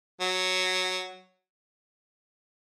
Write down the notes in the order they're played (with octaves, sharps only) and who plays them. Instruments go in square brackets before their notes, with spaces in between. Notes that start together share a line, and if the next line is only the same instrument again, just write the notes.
[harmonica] F#3